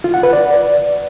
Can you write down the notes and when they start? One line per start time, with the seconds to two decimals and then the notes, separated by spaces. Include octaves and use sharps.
0.04 F4
0.14 F#5
0.23 B4
0.33 D5